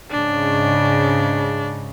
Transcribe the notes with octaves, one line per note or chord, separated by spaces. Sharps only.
G#2 C#3 D4